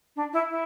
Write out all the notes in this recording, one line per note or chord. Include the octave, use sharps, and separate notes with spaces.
D4
E4
E4